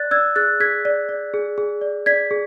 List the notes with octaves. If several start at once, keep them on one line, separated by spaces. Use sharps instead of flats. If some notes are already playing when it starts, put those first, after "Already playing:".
Already playing: D5 F#6 A6
D5 E6 G#6
G#4 F#6 A6
G#4 G#6 B6
D5
D5
G#4
G#4
D5
D5 G#6 B6
G#4